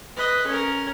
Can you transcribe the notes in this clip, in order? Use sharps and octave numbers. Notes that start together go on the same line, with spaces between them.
B4 D#5
C#4 A#4